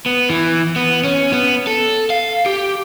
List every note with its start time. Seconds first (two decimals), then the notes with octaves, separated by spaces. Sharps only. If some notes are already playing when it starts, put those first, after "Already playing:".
0.06 B3
0.30 E3
0.76 B3
1.04 C#4
1.33 B3
1.67 A4
2.10 F5
2.46 G4